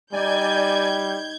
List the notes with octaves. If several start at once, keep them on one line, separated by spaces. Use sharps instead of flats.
G3 D#4 D5 D#5 G#5 G6 G#6